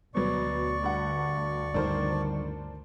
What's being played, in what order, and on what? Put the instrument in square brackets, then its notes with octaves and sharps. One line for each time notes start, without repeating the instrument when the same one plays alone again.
[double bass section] D2 [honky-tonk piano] B2 F#3 B3 [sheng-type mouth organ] D5 C#6
[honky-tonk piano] G2 F#5
[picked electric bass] G2 D3 D#3 [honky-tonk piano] D4 A#4 C5